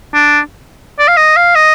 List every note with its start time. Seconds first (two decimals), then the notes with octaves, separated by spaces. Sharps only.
0.14 D4
0.99 D5
1.08 F5
1.17 D#5
1.36 F5
1.55 D#5